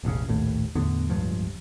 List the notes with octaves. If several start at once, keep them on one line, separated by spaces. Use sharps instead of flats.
E1 A1 A#2 C#3
A#1 D#2 A2
E2 A2 D3 B3
D1 C#2 G2 F3